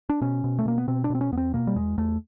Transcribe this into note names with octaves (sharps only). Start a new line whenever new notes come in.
D4
B2 C#4
B2
A3
B2 A#3
B3
B2 C4
D4
B2 C4
C#4
E2 B3
C4
B2 A#3
G3
E2 G#3
E2 A3